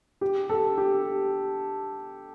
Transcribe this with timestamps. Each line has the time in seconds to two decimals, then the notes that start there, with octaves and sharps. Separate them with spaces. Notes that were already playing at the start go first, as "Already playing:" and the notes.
0.21 G4
0.49 A4
0.78 G4